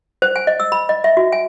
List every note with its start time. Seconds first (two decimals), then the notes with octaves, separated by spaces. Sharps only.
0.22 C5
0.36 G#5
0.47 D#5
0.60 E6
0.72 B5
0.89 D#5
1.04 E5
1.17 F#4
1.32 G#5